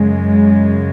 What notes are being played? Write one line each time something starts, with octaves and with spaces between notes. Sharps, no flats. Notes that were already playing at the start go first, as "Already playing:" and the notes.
Already playing: F#2 C#3 G#3